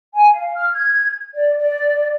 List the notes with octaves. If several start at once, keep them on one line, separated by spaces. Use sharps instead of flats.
G#5
F5
F6
G#6
D5
D5